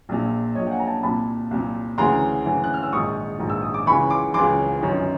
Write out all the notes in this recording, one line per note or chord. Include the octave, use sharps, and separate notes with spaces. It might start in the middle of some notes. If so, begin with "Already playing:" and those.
A#1 A#2
A#1 A#2 C#5 D#5
G5
F#5 G#5
A#5
G5 A5
C2 A#2 A5 B5
C2 A#2
D2 C#3 E3 A#5 C6
D2 C#3 E3
F#6
F6
E6
A#1 G#2 D#3 C#6 D#6
A#1 G#2 D#3
E6
D#6
D6
C#2 C#3 E3 B5 C#6
C6 D6
C#2 C#3 E3 C6 D6
G1 F#2 D#3